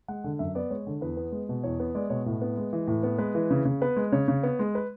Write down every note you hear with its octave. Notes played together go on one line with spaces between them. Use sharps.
G#3 F#5
D3
F#2 E5
B3 D5
G#3 C#5
D3
E2 B4
B3
G#3
B2
E2 C#5
B3
G#3 D5
B2 C#5
A2
B3
G#3
E3
A2
B3
G#3 B4
E3
C#3
C#3
B3 B4
G#3
C#3 C#5
C#3
B3
G#3
B4